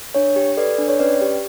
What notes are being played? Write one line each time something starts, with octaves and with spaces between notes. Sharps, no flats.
D4 C#5
G4
A4 B4 D5
D4
C#5
C#4 B4 D5
G4